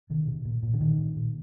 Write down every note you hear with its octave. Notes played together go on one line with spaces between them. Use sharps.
B2 D#3
B2
A#2
A#2
D3
A#2 D#3
A#2
A#2